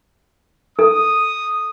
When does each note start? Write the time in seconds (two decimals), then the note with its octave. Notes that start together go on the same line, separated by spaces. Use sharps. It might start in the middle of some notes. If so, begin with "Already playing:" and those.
0.79 A4 D#6